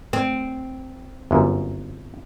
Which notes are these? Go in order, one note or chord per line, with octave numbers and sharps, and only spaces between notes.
C4
G1 F#2